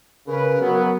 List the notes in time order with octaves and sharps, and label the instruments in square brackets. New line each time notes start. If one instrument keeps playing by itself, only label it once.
[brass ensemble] C#3 B4 [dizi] A#4
[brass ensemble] F#3 B3